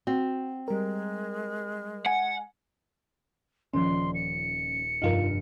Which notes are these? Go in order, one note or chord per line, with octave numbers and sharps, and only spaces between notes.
C4 F#4
G3 G#3 A#4
F#5 G#5
D#1 F3 C#4 C5 D5 C6
C#7
F1 G2 D#4 F4 A#4 F5